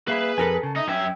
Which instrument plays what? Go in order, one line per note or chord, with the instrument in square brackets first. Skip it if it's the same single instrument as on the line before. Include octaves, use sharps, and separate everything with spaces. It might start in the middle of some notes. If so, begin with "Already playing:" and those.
[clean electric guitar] A#3 E5 F5 [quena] G#4 [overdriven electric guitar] B4 B5
[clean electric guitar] F2 [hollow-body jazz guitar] A4 A#4 G#5
[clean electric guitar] C#3 [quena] A5
[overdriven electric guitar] D#4 [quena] E5
[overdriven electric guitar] F#2 E5 [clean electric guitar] C#4 [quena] G5